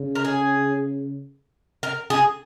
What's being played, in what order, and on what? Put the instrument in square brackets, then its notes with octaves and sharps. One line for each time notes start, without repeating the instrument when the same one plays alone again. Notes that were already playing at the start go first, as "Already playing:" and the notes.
Already playing: [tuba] C#3
[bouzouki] A#4
G#4
A#4
G#4